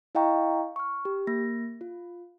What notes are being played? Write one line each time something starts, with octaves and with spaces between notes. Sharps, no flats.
E4 D#5 F5 G5 A#5 C#6
C#6 F6
G4
A#3 A#6
F4